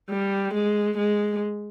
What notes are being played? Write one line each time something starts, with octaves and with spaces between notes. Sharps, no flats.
G3
G#3
G#3